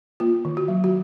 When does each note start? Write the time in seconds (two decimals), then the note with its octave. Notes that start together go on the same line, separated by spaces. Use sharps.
0.20 A#3 F4
0.45 D#3
0.57 F#4
0.68 F#3
0.84 F#4